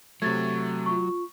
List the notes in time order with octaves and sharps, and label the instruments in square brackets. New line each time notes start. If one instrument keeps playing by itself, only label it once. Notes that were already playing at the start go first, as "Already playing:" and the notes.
[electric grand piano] C3 A3 [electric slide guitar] F#3 [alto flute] C#6 [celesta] G#6 A6
[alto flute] F4 [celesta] C#6